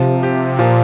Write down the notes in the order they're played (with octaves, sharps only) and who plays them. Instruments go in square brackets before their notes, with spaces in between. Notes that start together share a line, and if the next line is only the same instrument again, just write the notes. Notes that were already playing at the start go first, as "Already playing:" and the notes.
Already playing: [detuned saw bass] C3 [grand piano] F3
[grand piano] G4
[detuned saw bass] A#2 [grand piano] F3